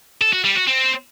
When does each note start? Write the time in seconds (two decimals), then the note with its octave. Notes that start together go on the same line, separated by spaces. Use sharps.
0.21 A4
0.33 F#4
0.44 G3
0.56 F#4
0.67 C4